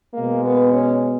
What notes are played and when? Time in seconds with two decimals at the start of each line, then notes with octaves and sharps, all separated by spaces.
0.14 B2 G#3 A#3
0.44 B3
0.73 C#4